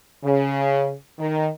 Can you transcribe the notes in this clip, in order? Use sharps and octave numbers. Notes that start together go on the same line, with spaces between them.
C#3
D#3